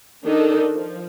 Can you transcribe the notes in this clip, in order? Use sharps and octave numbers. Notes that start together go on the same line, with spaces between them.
D#3 D4 D#4 A4
F3